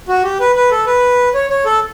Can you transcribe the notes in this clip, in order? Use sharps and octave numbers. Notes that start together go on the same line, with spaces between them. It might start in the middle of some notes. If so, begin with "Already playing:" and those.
F#4
G4
B4
B4
A4
B4
C#5
C#5
A4